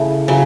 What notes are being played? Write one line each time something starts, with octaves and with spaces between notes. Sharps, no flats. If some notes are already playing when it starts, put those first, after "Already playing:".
Already playing: C#3 A3 E4
C#3 F#3